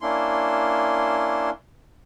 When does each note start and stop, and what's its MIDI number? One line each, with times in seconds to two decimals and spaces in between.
0.01 1.50 58
0.01 1.50 61
0.01 1.50 62
0.01 1.50 64
0.01 1.50 84